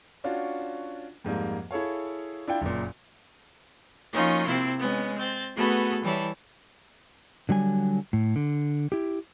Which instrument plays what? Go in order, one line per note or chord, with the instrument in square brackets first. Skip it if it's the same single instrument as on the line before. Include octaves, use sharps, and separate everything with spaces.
[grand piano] C#4 D4 F4 F#4
F2 G#2 G3 A#3
E4 G#4 A4 C#5 F5
D4 E4 F4 G5
F#1 A#2
[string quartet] F3 A#3 C#4 D#4 F4 F#4
C3 C4 E4
G#3 B3 C#4
C4 G6 A6
A3 B3 F#4 G#4 A4 B4
E3 G3 E4 C#5 A5
[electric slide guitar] D3 F#3 G3 G#5
A2
D3
E4 G4